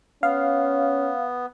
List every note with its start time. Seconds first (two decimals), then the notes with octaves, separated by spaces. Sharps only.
0.23 B3 C#4 F5